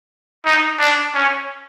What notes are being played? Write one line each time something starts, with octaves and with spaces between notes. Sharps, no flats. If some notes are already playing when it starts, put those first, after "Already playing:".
D#4
D4
C#4